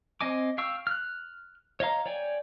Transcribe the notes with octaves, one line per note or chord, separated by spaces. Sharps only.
C4 D#5 G#5 D6
F5 G5 C#6 E6
F6 F#6
C#5 D#5 F5 A#5
C#5 D5 G5 G#5